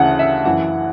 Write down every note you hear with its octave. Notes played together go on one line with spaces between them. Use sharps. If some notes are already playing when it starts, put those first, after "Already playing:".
Already playing: D2 C#3 E3 F#5 A5
E5
F#2 E3 F#5